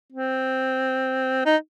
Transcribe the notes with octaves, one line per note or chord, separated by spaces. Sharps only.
C4
D#4